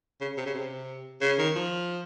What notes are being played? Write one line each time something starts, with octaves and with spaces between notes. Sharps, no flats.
C#3
C3
C#3
C3
C#3
D#3
F3